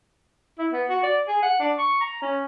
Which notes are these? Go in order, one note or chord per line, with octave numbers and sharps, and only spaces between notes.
E4
B3
F#4
D5
G#4
F#5
D4
C#6
A#5
C#4